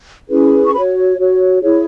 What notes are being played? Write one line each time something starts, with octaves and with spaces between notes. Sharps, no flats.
C#4 E4 G#4 B4
C#6
F#4 B4 B5
C#5
F#4 C#5
E4 G#4 C#5